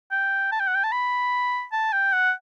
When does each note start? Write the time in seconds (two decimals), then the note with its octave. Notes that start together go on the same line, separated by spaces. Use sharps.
0.11 G5
0.52 A5
0.60 G5
0.67 F#5
0.75 G5
0.84 A5
0.92 B5
1.72 A5
1.93 G5
2.13 F#5